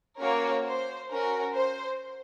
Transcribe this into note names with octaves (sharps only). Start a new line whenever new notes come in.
A#3 C#4 F#4 A#4 C#5
C5
C#4 F#4 A#4
C5